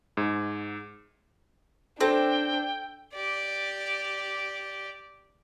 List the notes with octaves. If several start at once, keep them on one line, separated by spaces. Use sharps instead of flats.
G#2
C4 D4 A4 G5
G4 D5